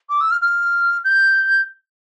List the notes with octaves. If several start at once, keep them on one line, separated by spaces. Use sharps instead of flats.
D6
E6
F6
F6
G6